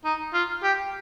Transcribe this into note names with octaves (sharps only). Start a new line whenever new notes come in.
D#4
F4
G4